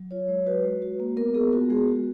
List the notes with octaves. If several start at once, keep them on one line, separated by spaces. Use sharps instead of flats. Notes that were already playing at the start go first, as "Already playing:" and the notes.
Already playing: F#3
F4 C#5
G#3
F#4 B4
G#3
F#4
A#3
B3 A#4
B3 G#4
F4 F#4
G#3 G#4
F#4